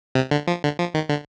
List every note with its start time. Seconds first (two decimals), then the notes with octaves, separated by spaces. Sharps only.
0.15 C3
0.31 D3
0.47 F3
0.63 D3
0.79 F3
0.94 D#3
1.09 D3